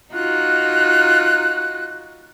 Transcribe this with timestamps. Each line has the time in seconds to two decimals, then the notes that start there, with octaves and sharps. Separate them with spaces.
0.14 D#4 F4 F#4 F#6